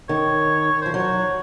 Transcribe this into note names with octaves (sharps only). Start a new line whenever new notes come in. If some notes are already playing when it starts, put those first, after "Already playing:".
D#3 C#5
F3 C5
F#3 C#5